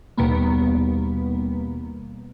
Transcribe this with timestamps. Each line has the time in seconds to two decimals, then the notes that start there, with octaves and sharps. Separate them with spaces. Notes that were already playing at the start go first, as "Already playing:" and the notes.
0.17 D#2 B2 G3 A#3 B3